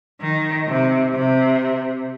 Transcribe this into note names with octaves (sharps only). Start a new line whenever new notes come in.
D#3
C3
C3